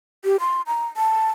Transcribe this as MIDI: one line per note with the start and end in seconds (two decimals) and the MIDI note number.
0.25 0.37 67
0.40 0.62 84
0.67 0.86 82
0.97 1.30 81